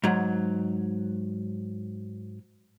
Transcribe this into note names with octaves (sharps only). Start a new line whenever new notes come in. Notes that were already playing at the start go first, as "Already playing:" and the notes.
G#2 F#3